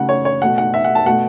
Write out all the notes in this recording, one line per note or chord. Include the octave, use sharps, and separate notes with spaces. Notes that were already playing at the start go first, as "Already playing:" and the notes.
Already playing: C#3 F#3 A3 F#5
C#5
C#5
B2 A3 F#5
F#5
E5
F#5
A5
B2 A3 F#5